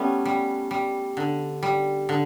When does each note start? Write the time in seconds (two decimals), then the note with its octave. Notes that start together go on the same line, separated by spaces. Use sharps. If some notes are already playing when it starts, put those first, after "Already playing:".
Already playing: G3 A3 B3 C#4
0.25 G3
0.71 G3
1.17 D3
1.63 G3
2.09 D3